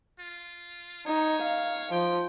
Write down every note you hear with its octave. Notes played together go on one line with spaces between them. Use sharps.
F4
D#4 C#5
F5
F3 G5